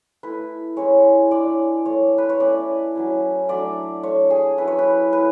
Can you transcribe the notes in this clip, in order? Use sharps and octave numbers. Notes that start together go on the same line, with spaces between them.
A3 E4 B4
G#3 C#4 E4 C#5
G#3 D4 D5
A3 D4 C#5
B4
C#5
A3 C#4 E4 D5
F#3 C#4 E4
F#3 A3 D4 D5
A3 D4 C#5
G#4
F#3 C#4 E4 B4
C#5
B4
A3 E4 B4